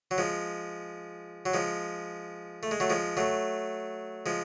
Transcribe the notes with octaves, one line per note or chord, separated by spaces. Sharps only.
F#3
F3 G#3
F#3
F3 G#3
A3
G#3
F#3 A3
F3 G#3
F#3 A3
F3 G#3